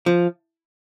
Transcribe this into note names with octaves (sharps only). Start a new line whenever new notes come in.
F3